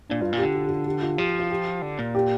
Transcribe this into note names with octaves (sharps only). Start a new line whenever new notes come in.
A#2 D4
G2 F4
A#2
G4
D3
F4
G4
F4
G4
F4
F3 G4
F4
F4
G4
D3
A#2
G4